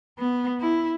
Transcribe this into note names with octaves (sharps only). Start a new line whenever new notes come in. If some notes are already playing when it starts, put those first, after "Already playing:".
B3
E4